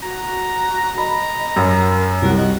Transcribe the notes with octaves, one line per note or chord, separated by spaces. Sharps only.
F#4 A#5
D#5 A#5 B5
F#2 A#4
C2 G3 F#4 A#4
F#4 D#5